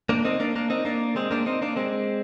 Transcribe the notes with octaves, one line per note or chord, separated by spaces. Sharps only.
A#3 D4
C4 D#4
A#3 D4
A#3 D4
C4 D#4
A#3 D4
G#3 C4
A#3 D4
C4 D#4
A#3 D4
G#3 C4